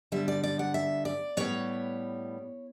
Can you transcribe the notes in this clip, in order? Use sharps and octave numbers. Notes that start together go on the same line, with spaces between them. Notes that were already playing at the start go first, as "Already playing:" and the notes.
D3 G3 B3 E5
D5
D5
F#5
E5
D5
A2 G3 B3 C#5